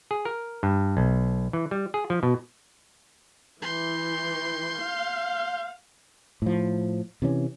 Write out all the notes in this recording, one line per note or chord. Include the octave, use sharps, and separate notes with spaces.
G#4
A#4
G2
B1
E3
G3
G#4
F3
B2
E3 C6 G6
F5
A2 F3
C3 E3 C#4